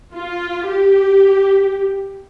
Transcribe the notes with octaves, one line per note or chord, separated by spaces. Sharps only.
F4
G4